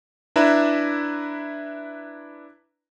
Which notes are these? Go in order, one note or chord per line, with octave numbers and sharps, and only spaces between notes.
D4 E4 B4 E5 A#5